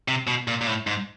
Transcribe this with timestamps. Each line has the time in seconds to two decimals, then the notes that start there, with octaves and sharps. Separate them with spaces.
0.08 C3
0.27 B2
0.48 A#2
0.61 A#2
0.67 A2
0.87 G#2